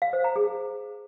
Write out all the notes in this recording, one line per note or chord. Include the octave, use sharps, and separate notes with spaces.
F5
C5
A#5
G#4